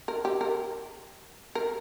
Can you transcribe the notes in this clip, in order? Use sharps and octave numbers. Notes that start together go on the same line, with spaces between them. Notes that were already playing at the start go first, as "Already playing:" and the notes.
A#4
G4
A#4
A#4